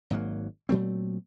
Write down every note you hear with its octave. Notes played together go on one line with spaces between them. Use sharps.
G#1 G#2 F#3 A#3
A#2 F#3 A3 C4